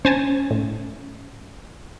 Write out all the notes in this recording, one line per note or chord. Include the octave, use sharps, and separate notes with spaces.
C#4 C5 G#5 A5
A2